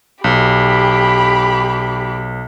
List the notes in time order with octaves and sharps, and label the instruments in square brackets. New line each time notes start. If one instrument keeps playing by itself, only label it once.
[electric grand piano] B1 [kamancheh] G4 B5